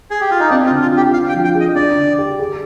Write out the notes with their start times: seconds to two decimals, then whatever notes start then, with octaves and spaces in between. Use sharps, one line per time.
0.11 G#4
0.21 G4
0.31 F4
0.40 D#4
0.50 C4 D4
0.66 F4
0.70 D3
0.82 F4
0.92 F4
0.97 G4
1.12 D4 F5
1.29 G5
1.34 F3
1.44 G5
1.55 G#4
1.60 D#5
1.75 D4 D5
1.97 D3
2.18 G4
2.39 G#4